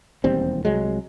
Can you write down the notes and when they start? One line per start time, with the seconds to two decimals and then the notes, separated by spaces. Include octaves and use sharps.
0.24 E1 D#2 G3 C4
0.65 C2 F#3 G#3